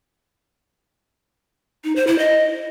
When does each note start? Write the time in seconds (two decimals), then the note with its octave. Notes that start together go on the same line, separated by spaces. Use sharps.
1.84 D#4
1.96 C5
2.07 E4
2.19 D#5